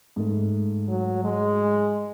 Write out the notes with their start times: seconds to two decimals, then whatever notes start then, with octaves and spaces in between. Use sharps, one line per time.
0.16 G#2 A3
0.88 F#3
1.24 G#3